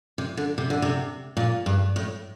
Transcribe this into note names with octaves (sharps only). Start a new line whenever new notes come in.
C3
D3
C3
D3
C3
A#2
G2
A2